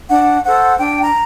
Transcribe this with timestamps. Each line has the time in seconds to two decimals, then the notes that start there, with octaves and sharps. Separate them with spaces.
0.08 D4 F#5
0.44 A4 C5 F#5
0.78 D4 G5
1.02 A#5